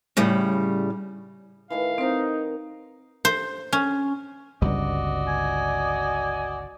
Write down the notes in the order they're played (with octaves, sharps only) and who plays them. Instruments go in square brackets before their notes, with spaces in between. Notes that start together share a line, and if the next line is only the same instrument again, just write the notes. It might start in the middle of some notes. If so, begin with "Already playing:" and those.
[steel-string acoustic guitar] A2 C#3 G3
[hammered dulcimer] A2 D#3 E3 [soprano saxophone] F5
[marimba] C4 C5 [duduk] D#4 [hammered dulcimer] D#5 A#5
[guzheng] C5
C#4
[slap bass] G1 C#2 G3 [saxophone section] F#4 D5 D#5
[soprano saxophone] G#5